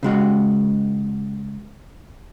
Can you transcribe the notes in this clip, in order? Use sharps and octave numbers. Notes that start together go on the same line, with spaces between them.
C#3 G#3 F#4